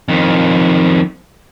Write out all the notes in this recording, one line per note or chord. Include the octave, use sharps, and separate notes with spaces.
F2 D#3